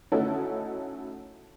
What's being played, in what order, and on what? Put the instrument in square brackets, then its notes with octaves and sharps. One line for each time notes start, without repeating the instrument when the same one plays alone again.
[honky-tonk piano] A3 C#4 D#4 E4 F#4 A4